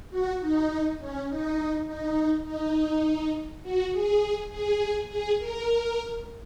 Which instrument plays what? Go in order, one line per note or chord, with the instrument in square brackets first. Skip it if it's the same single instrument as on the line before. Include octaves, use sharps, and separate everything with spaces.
[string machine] F#4
D#4
C#4
D#4
D#4
D#4
F#4
G#4
G#4
G#4
A#4